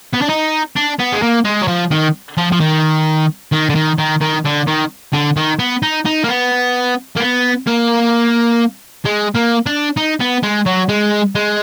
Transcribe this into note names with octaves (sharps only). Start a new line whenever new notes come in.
B3
D4
D#4
D4
B3
G#3
A#3
G#3
F#3
F3
D#3
F3
F3
D#3
D#3
D3
D#3
D#3
D#3
D3
D#3
D3
D#3
B3
D#4
D#4
A#3
B3
A#3
B3
A#3
G#3
A#3
D4
D#4
B3
G#3
F#3
G#3
G#3